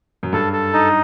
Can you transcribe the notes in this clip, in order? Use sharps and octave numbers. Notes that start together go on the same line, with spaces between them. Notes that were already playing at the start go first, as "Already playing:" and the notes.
F#2
G2 A4
A4
D#4